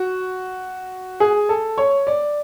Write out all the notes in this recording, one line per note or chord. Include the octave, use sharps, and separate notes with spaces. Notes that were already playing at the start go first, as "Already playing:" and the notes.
Already playing: F#4
G#4
A4
C#5
D5